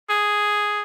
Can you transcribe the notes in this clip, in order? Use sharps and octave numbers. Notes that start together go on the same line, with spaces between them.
G#4